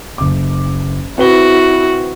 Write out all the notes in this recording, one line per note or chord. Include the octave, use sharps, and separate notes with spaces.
F#1 D6
C4 E4 F#4 B4 G7